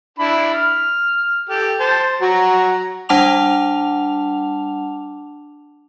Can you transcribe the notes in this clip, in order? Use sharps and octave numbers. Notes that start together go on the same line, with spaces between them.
D4 E4 B5
F6
G4 A4
C5 A5
F#3 F#4 A#5
G3 D4 F#5 A5 D6 F7